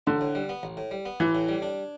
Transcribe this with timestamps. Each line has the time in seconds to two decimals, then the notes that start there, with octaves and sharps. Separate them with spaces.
0.07 A1 D3
0.21 A2
0.35 G3
0.49 B3
0.63 A1
0.77 A2
0.91 G3
1.05 B3
1.20 A1 E3
1.35 A2
1.49 G3
1.62 D4